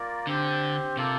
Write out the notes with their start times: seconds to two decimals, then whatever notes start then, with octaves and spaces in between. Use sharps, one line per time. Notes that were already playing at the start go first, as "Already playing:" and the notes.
Already playing: A#3 F4 A#4 D5
0.27 D3 C4 G4 C5
0.97 C3 A#3 F4 A4